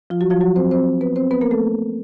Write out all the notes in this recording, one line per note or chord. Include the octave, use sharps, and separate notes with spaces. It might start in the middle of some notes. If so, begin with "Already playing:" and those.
F3 F4
F#3 F#4
F3 F4
F#3 F#4
C4 C5
C4 C5
B3 B4
C4 C5
B3 B4
A#3 A#4
A3 A4